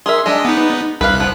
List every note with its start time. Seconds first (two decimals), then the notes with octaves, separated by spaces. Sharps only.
0.06 G#4 A#4 E5 C6
0.26 G#3 D4 D#5 E5
0.45 B3 D#4
1.01 C2 B4 F5 F#6
1.20 F3 B3